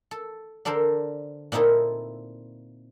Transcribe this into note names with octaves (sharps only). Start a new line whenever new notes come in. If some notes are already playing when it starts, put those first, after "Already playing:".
A4
D3 D4 A4 A#4 C5
A#2 C4 D#4 E4 A4